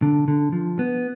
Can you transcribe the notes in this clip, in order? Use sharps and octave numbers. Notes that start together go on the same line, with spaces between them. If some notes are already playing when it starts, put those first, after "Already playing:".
D3
D3
F3
B3